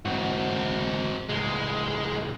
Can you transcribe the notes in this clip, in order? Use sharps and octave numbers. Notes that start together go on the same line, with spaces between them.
G#2 E3 C4 F#4
C#2 A2 G#3